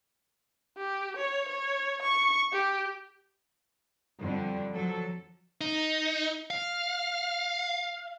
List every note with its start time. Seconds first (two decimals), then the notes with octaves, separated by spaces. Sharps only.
0.77 G4
1.17 C#5
1.48 C#5
2.02 C#6
2.52 G4
4.20 F2 D3 G3
4.73 F3 F#3 A4
5.61 D#4
6.50 F5